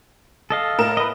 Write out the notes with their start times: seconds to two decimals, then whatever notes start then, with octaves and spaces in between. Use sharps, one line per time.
0.50 A4 D#5 F5
0.78 A2 A#4 E7
0.97 B4 D#5